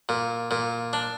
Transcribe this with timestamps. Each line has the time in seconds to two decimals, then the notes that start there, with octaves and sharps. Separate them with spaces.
0.09 A#2
0.51 A#2
0.93 D4